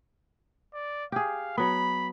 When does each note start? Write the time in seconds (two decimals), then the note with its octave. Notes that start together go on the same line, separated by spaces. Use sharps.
0.74 D5
1.12 G4 G#4 F5
1.58 F#3 B3 B5